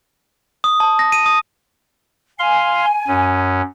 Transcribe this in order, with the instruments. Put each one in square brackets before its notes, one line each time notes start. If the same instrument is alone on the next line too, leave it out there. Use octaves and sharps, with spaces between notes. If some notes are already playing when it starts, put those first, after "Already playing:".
[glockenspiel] D#6
A5
A#6
D#7
D#6
[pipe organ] F5 C6 [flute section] G#5
[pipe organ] F#2 C#4